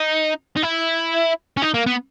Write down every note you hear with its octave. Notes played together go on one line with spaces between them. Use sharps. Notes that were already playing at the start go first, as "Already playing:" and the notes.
Already playing: D#4
D#4
E4
C#4
D#4
A#3
B3